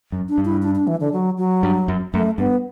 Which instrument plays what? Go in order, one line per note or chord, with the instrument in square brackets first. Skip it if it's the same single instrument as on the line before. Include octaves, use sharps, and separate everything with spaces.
[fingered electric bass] F#2
[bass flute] D4
[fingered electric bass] G2
[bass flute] E4
D4
D4
E3
D3
F#3
F#3
[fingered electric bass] G2
F#2
[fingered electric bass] F#2 [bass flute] A3
[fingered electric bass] G2 [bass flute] B3